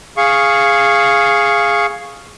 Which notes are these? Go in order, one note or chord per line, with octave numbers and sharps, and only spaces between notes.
G#4 F5 C#6